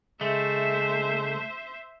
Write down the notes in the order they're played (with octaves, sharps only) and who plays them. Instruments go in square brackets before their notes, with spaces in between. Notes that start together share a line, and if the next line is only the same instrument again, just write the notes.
[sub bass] C#3 [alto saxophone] G#3 [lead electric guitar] A3 [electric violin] C5 E5